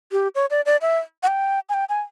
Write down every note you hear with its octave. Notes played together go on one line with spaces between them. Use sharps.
G4
C#5
D5
D5
E5
F#5
G5
G#5
G5
G#5